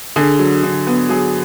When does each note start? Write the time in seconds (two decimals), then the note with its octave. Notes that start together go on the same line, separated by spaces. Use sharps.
0.16 D3 G#4
0.39 F#3
0.63 D3
0.87 B3
1.09 F#3 G#4